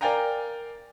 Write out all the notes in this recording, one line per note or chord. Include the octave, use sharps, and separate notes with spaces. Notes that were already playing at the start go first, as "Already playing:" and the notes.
A#4 D5 F5 G5 G#5 A#5